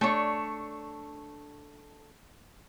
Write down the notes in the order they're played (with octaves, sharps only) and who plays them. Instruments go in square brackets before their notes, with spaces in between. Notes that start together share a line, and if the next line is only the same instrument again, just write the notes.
[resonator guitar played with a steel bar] A3 D4 C#5